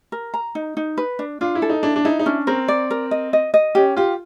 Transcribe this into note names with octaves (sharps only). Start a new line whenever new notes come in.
A#4
A#5
D#4
D#4
B4
D4
D4 F4
E4
A4
D#4
D4 E4
D4
D#4 E4
D#4
C#4 D4
C4 A#4
D5
A#4
D#5
D#5
D#5
C#4 G4
F4 G4